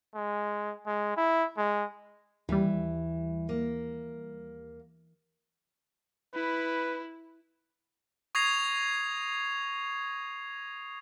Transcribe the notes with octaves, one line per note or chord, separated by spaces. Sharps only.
G#3
G#3
E4
G#3
D#2 E3 G3
A#3
E4 B4
C#6 D#6 G#6 A#6 C7 F7